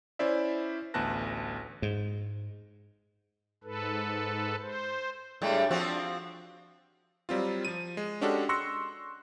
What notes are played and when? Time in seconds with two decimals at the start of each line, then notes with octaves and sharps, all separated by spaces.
0.19 C#4 E4 C5 D5 E5
0.94 A1 D2 B3 A5 F#6 A#6
1.82 G#2
3.64 G#2 A4 B4
4.61 C5
5.42 A2 G3 G#3 D4
5.71 F3 C4 F#4
7.29 F#3 G3 C4 F4
7.65 F3 D#7
7.97 G#3
8.21 G#3 C#4 D4 F#4 G4 A4
8.49 C6 C#6 E6 F#6 A#6 C#7